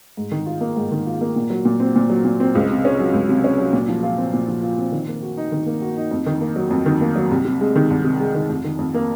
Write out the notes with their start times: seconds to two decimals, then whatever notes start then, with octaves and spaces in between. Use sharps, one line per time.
0.17 G#2
0.32 D#3
0.46 F4
0.61 A#3
0.76 G#2
0.92 D#3
1.07 F4
1.21 A#3
1.36 A#2
1.50 F#3
1.65 A#2
1.80 C4
1.96 A#2
2.10 F#3
2.25 A#2
2.40 C4
2.55 C#2
2.70 C3
2.85 C#4
2.99 F#3
3.14 C#2
3.29 C3
3.44 C#4
3.58 F#3
3.73 A#2
3.89 F3
4.03 F4
4.18 C4
4.33 A#2
4.48 F3
4.63 F4
4.78 C4
4.92 D#3
5.08 A#3
5.22 F#4
5.37 D#4
5.52 D#3
5.66 A#3
5.82 F#4
5.97 D#4
6.11 F2
6.26 D#3
6.41 A#3
6.56 F#3
6.70 F2
6.86 D#3
7.01 A#3
7.16 F#3
7.31 C2
7.45 C3
7.61 G#3
7.76 D#3
7.91 C2
8.04 C3
8.20 G#3
8.35 D#3
8.49 F2
8.64 D#3
8.79 F2
8.94 A#3